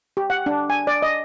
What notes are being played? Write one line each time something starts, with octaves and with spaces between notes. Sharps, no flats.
G4
F#5
D4
G#5
D5
D#5